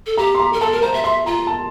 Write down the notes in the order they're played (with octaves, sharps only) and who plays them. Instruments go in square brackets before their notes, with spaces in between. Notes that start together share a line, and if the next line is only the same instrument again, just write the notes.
[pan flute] A4
[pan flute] G4 [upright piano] A#5
[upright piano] C6
A#5
[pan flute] A#4
[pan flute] A4 [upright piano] A5
[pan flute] A#4
[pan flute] C5 [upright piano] A#5
[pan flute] E5
[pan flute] E5 [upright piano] C6
[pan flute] F4 [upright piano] A#5
[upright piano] A5